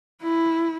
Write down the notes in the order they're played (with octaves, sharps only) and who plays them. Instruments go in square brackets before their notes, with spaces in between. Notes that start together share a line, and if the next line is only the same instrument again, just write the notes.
[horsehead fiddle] E4